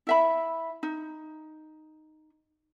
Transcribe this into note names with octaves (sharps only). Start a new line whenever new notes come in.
E4 E5 B5
D#4